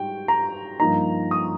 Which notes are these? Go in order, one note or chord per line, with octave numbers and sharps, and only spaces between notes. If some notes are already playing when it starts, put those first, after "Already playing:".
Already playing: G#2 G3 G5
A#5
G2 F3 A#3 D#4 A#5
D#6